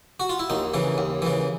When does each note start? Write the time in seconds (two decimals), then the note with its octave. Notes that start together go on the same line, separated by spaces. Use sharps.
0.20 F#4
0.29 F4
0.39 E4
0.50 D#2 D#4
0.74 C#3 E3
0.98 D#2
1.22 C#3 E3